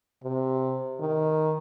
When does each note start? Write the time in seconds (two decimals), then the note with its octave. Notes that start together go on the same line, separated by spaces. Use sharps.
0.24 C3
1.00 D#3